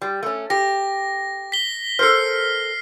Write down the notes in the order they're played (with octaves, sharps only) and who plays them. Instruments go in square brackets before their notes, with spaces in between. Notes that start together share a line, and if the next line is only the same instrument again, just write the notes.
[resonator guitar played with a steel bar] G3
A3 C#4
[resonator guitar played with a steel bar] G4 [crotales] A#6
[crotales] B6 G7
[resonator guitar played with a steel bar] A4 A#4 C5 [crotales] F6 C7